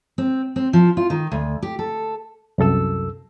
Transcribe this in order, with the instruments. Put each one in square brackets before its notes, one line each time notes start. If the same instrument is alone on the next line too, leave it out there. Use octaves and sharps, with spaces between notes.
[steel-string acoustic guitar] C4
C4
F3
F4
D#3
D2
G4
A4
[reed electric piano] C2 F#2 A4 E6